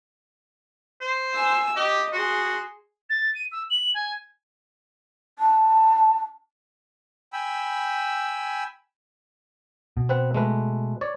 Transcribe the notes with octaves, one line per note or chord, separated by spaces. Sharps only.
C5
G#5 E6
G4 D#5
F#4 G#4 C6
A6
D#7
E6
F#7
G#5
A5
G5 G#5 B5 E6
B2
C4 B4 F#5
G#3 A3 B4
C#5 D5